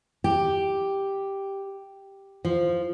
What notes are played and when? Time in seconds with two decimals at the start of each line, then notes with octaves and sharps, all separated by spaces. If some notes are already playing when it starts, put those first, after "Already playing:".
0.24 G4
2.45 F3